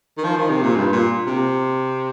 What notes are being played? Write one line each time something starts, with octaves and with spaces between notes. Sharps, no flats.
D#3
F3
D#3
C3
A#2
G2
A#2
C3